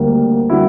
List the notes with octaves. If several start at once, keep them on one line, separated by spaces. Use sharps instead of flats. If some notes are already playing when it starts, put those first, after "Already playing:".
Already playing: D2 D3 G3 A#3
D3 G3 E4 F#4